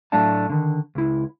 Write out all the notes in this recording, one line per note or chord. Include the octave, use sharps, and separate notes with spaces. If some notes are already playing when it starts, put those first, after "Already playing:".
A2 F#3 A3 D4 F5 A5
D3 D#3
C#2 E4